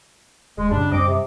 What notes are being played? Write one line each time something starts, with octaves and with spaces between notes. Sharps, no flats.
D#1 G#3
F#2 A2 C#3 G3 D4
F#2 G3 C4 D#5 D6
C3